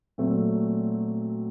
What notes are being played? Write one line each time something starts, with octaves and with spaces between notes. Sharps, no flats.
A#2 F#3 A3 C4